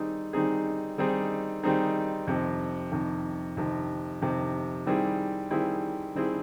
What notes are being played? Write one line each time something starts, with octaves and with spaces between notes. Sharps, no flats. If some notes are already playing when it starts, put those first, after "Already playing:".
Already playing: D#3 G3 C4 D#4 G#4
D#3 G3 C4 D#4 G#4
D#3 G3 C4 D#4 G#4
D#3 G3 C4 D#4 G#4
F2 C3 D#3
F2 C3 D#3
F2 C3 D#3
F2 C3 D#3
D#3 G3 C4 E4 G#4
D#3 G3 C4 E4 G#4
D#3 G3 C4 E4 G#4